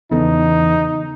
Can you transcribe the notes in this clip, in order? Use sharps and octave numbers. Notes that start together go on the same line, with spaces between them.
E2 C#3 B3 D#4 A4